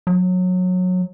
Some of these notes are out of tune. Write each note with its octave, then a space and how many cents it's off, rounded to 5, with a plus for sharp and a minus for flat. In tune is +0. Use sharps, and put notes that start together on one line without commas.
F#3 -20